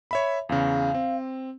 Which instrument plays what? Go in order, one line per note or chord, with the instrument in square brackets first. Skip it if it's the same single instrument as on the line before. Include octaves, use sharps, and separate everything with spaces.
[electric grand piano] C#5 E5 B5
[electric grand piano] E2 C#3 [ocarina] F5
[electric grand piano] C4